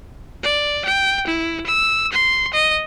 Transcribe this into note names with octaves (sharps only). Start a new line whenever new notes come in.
D5
G5
E4
E6
C6
D#5